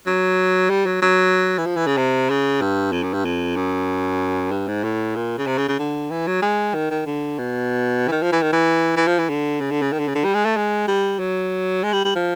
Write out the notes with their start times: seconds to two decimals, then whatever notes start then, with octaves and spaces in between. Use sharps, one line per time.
0.06 F#3
0.70 G3
0.86 F#3
1.02 F#3
1.58 E3
1.66 F3
1.76 E3
1.87 C#3
1.97 C3
2.30 C#3
2.61 G2
2.92 F2
3.03 F#2
3.14 G2
3.25 F2
3.56 F#2
4.52 G2
4.68 G#2
4.84 A2
5.16 A#2
5.38 C#3
5.47 C3
5.58 C#3
5.68 C#3
5.79 D3
6.11 E3
6.27 F#3
6.42 G#3
6.74 D#3
6.91 D#3
7.06 D3
7.38 B2
8.08 E3
8.12 D#3
8.22 F3
8.32 E3
8.42 D#3
8.52 E3
8.96 E3
9.07 F3
9.19 E3
9.29 D3
9.61 C#3
9.71 D3
9.82 C#3
9.92 D#3
9.99 D3
10.08 C#3
10.15 D3
10.24 G3
10.34 G#3
10.45 A3
10.56 G#3
10.88 G3
11.19 F#3
11.84 G#3
11.93 G3
12.05 G3
12.16 F3